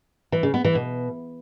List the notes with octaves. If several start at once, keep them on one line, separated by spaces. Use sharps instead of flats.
E3
C#3
B3
E3
B2